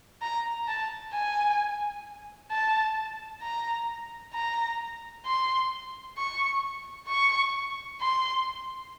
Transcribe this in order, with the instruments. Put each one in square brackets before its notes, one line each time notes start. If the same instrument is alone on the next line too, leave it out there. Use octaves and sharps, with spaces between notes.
[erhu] A#5
A5
G#5
A5
A#5
A#5
C6
C#6
C#6
C6